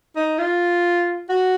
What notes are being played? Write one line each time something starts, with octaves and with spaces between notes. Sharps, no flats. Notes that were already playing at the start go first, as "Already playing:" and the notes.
D#4
F4
F#4